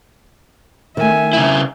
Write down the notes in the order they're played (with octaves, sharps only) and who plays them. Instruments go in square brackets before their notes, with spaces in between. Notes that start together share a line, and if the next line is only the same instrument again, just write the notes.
[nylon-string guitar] D#3 A3 [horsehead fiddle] E5 G#5
[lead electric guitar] C#3 E4